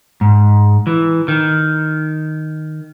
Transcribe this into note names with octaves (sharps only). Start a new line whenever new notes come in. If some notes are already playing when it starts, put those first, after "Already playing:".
G#2
E3
D#3